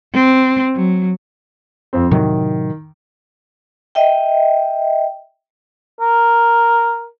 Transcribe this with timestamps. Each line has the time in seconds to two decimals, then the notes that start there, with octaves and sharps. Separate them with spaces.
0.14 C4
0.75 F#3
1.93 F2 C4
2.11 A2 C3 D#3 F#3
3.95 D#5 E5 G5
6.01 A#4